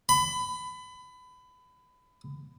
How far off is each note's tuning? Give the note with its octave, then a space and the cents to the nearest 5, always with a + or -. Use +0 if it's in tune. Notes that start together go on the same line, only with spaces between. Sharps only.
B5 +25